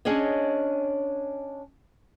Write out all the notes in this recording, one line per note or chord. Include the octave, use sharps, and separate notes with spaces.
C#4 D4 G#4 C#5 D#5